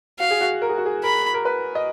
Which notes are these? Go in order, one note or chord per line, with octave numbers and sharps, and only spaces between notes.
F#4 F5
G#4
F#4
A#4
G#4
F#4
G#4
A#4 B5
A#4
B4
D#5